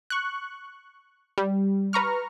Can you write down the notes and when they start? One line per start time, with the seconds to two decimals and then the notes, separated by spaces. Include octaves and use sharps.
0.10 C#6 F#6
1.38 G3
1.93 B4 A#5 C#6 F6